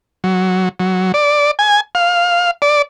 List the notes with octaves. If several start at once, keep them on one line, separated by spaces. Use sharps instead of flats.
F#3
F#3
D5
G#5
F5
D5